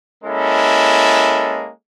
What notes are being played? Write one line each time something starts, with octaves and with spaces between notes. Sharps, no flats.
G#3 A#3 C#4 E4 A4